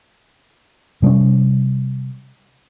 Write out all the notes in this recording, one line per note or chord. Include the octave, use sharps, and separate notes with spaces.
C3 G3 C4 C#4